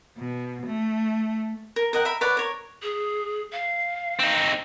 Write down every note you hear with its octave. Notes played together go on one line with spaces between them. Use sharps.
B2
A3
A#4
A#4 D#5 F#5 G5
A#4 E5 B5
B4 C#5 D5 F#5
A#4 C#5
G#4
F5
C4 D#4